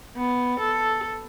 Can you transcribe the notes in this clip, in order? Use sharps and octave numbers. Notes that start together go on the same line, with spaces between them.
B3
A4